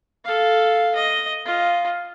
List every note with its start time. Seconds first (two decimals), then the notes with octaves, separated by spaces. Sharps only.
0.25 A4 F5
0.95 D#5
1.46 F4 D#5